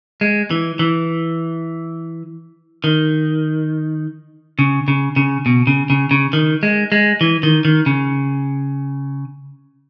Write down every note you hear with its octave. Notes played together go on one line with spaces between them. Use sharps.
G#3
E3
E3
D#3
C#3
C#3
C#3
B2
C#3
C#3
C#3
D#3
G#3
G#3
E3
D#3
D#3
C#3